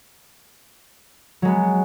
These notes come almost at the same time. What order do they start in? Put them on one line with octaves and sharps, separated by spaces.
F#3 G#3 B3